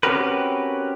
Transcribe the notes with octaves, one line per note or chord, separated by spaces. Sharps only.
C4 C#4 F#4 G4 A#4 B4